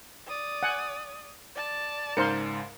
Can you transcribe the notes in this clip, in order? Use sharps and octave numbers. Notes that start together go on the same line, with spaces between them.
D5 D#6
F#5 G#5
D5 A5
C#2 G#2 A#4 C5 C6 C#7